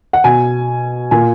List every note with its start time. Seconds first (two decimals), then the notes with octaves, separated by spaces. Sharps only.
0.13 F#5
0.24 B2 G#5
1.11 A#2 G#5